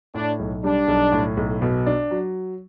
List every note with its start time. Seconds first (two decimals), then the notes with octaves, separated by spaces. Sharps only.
0.15 A2 D4
0.39 B1
0.64 G3 D4
0.88 B1
1.12 A2
1.37 B1
1.62 B2
1.86 D4
2.11 F#3